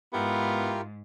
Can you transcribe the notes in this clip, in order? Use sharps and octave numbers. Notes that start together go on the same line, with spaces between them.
G#2 B3 E4 F4 G4 A#4